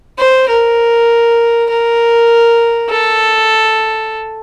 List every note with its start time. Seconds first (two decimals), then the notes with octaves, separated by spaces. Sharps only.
0.19 C5
0.49 A#4
1.69 A#4
2.90 A4